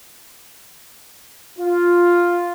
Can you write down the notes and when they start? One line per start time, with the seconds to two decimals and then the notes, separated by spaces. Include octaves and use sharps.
1.59 F4